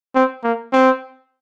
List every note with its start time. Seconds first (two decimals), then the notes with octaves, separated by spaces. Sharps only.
0.15 C4
0.44 A#3
0.73 C4